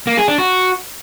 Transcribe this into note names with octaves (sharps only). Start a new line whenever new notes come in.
A#3
G#4
D4
F#4